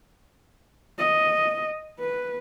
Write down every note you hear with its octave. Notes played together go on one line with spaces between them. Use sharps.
D#5
B4